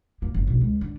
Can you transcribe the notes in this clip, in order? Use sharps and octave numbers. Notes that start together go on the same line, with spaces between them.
A#3
F#1
B1
C#2
D3